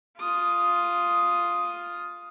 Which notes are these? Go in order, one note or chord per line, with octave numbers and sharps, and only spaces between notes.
F4 D#6